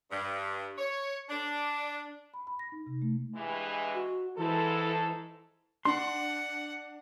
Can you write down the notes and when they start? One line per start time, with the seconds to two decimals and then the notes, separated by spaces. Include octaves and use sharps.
0.10 G2
0.78 C#5
1.29 D4
2.34 B5
2.47 B5
2.59 A#6
2.72 D#4
2.86 C3
3.02 A3
3.35 G2 E3 G#3
3.94 F#4
4.37 G#2 E3 A4
5.85 D4 F#5 C6